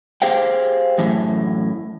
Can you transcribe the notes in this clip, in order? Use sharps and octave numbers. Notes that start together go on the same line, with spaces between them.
G4 G#4 C5 F5 G5
F#2 A2 E3